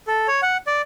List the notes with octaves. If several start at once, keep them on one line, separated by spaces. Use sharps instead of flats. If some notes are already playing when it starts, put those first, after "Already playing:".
A4
C#5
F#5
D5